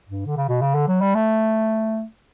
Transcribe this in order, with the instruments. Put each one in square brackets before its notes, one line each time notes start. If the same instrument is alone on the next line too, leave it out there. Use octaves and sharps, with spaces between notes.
[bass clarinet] G2
D3
C#3
B2
C#3
D3
F#3
G3
A3